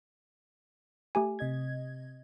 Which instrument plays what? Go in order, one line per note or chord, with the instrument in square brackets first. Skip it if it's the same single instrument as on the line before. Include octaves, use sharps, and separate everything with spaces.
[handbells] A3 G4 G#5
[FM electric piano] C3 D#5 G#6